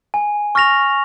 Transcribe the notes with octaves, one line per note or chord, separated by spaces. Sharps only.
G#5
C#6 F6 A#6 F7